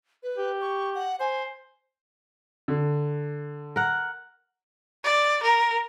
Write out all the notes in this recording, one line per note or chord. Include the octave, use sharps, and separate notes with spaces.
B4
G4
C#6
F#5
C5 G#5
D3
A#4 F#5
D5
A#4